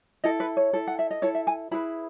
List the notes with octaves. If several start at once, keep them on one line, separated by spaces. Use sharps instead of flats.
E4 A4 D#5
B4
C#5
E4 A4
F#5
E5
D#5
E4 A4 C#5
E5
G#5
E4 G#4 B4 B5